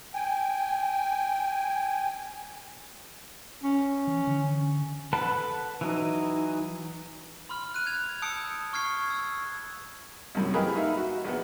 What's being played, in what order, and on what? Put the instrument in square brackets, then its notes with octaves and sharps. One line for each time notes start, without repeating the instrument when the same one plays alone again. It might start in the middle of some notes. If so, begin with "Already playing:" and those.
[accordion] G5 G#5
[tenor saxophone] C#4
[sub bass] E3
D3
[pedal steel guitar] A4 B4 F#5 A5 B5
E3 F#3 D#4
[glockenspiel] B5 C6 F6
F#6 D#7
F#6 G#6 D#7 F7
A5 D#6 E6 G6 C#7 D7
C#6 F6 G#6 C7
E6
[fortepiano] C2 F#2 A2
G4 G#4 A#4 B4 D#5 F5
D#4 E5 F5
F#4
A#1 B3